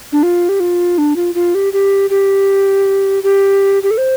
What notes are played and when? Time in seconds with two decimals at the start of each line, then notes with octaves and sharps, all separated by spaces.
0.12 D4
0.23 F4
0.49 G4
0.60 F4
0.98 D4
1.16 F4
1.35 F4
1.55 G4
1.73 G4
2.10 G4
3.23 G4
3.83 G4
3.91 A4
3.98 C5